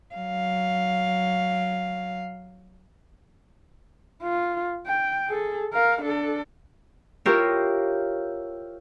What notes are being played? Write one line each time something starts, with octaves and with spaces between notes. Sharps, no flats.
F#3 F5
F4
G5
G#4 A4
A#4 F5
D4 A4
E4 F4 G4 A#4 C5 C#5